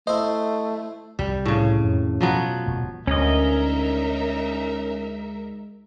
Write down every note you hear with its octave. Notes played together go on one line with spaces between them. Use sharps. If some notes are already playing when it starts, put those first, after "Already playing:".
A3 E4 C5 D#5
C2 G3
A2 C#3
F2 D#3
B2 F3 F#3 B3
D#1 B2 A3
D2 G#3 C#4 D#4 A#4 D#5 E5